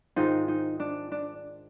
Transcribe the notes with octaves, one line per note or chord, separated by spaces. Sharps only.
G#2 D#3 G#3 C4 D#4 F4
D#4
D4
D4